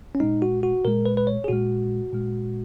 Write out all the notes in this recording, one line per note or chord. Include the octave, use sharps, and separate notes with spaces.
C#4
A#2 G#3 D#4
F#4
F#4
A#2 G#3 A#4
B4
B4
C#5
G#4
A#2 G#3 F#4
A#2 G#3